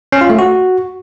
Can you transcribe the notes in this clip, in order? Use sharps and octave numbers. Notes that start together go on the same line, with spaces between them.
C#4
F4
A3
F#4